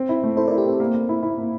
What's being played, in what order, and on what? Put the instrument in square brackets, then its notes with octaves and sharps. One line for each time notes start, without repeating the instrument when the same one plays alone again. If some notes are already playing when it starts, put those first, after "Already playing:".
Already playing: [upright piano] C4
E4
A3
[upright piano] E4 [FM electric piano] A4 C5
[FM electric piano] A#4 D5
[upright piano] E4
[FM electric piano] G4
[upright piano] C4 [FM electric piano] A4
[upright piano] A#3
A#3
E4
E4
A#3